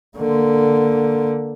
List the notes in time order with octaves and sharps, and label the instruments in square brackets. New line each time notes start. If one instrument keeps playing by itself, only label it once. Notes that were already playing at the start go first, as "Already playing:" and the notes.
[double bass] D3 A#3